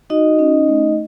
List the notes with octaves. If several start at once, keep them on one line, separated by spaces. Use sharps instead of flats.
D#4 F#4 D#5
C#4
A3